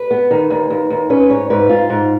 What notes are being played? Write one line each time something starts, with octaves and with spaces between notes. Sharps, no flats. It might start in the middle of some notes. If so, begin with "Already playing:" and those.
Already playing: B4
B3
D#3
D#2
D#2
D#2
C#4 B4
G#2 C#5
G#2 B4
G#2 F4
G#2